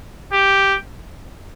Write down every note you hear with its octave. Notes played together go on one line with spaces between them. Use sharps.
G4